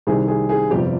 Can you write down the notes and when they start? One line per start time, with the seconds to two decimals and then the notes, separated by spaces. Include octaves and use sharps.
0.07 C2 C3 D#3 G#4
0.28 G#4
0.49 G#4
0.70 G1 F2 C3 G3 G4